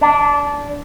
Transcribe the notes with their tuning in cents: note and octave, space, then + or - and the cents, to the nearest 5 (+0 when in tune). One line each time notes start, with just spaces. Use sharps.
D4 -20